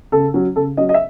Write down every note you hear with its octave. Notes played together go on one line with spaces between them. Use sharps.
C#3 A4
F#3 C#4
C#3 A4
F#3 C#4 D#5
D#5
E5